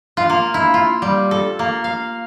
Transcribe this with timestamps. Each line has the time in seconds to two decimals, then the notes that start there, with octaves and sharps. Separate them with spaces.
0.17 F4
0.30 A#3
0.54 E4
0.74 F4
1.02 G3
1.31 A4
1.59 A#3
1.84 F5